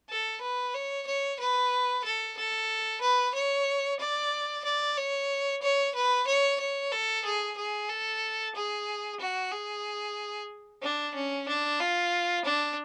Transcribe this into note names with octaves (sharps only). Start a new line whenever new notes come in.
A4
B4
C#5
C#5
B4
A4
A4
B4
C#5
D5
D5
C#5
C#5
B4
C#5
C#5
A4
G#4
G#4
A4
G#4
F#4
G#4
D4
C#4
D4
F4
D4